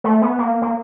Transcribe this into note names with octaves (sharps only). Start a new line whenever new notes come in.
A3
B3
A#3
A#3